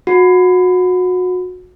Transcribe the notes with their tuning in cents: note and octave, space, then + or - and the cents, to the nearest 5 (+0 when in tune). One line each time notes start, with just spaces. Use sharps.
F#4 -25